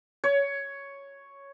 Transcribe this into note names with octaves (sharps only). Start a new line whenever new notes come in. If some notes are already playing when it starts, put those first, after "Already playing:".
C#5